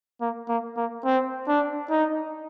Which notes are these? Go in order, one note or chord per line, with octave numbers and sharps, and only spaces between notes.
A#3
A#3
A#3
C4
D4
D#4